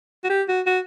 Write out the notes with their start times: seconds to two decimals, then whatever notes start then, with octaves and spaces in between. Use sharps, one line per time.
0.24 F#4
0.30 G4
0.48 F#4
0.66 F#4